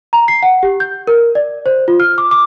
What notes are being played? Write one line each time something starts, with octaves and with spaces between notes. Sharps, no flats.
A#5
C7
F#5
G4
G6
A#4
D5
C5
F4
F6
D6
D6